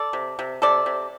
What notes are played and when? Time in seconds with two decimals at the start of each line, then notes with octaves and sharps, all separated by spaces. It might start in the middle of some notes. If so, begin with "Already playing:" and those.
Already playing: A4 D5
0.13 C3
0.39 C3
0.62 C3 A4 D5
0.86 C3